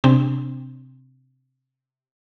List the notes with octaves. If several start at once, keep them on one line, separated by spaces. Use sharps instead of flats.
C3 C4 D4